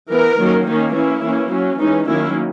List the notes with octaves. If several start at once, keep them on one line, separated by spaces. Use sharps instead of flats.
E3 B3 A#4
D#3 F#3 A#3 C#4
D#3 A#3 C#4 D#4
E3 A#3 C#4 E4
E3 A#3 C#4
F#3 C#4
E3 G#3 C#4 D#4
D#3 F#3 A#3 C#4 E4